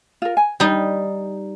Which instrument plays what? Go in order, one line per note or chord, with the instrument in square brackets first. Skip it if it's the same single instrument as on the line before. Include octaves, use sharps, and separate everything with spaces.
[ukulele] F4 A#4
G#5
[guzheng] G3 D#4 [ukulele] G5